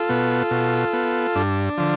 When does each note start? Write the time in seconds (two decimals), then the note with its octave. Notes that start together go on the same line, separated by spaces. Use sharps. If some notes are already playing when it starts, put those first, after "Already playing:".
Already playing: F4 A4
0.09 B2 B3
0.51 B2
0.93 B3
1.35 G2 D4
1.78 D3 F3